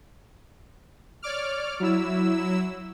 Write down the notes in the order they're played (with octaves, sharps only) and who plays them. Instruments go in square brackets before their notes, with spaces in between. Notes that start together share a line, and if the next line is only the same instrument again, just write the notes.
[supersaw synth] C#5 D5 D6 F6
F#3 E4 E6